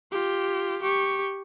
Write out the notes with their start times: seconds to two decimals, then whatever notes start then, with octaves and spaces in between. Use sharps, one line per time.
0.12 F4 G4
0.83 G4 C#6